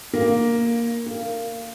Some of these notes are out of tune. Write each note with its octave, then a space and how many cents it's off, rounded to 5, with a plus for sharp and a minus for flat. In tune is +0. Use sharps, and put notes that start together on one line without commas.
A#3 +5
A#3 -20